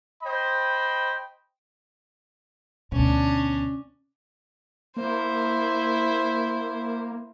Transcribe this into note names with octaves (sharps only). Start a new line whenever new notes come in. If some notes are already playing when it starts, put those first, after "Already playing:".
C5 D#5 G5 B5
D2 B2 C#4 D4
A#3 E4 C5